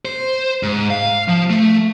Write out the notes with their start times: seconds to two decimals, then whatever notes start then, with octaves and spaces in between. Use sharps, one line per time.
0.05 C5
0.63 G#2
0.90 F5
1.28 F3
1.50 A3